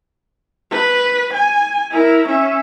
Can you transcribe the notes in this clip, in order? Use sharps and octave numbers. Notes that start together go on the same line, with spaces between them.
B4
G#5
E4 A#4
C#4 E5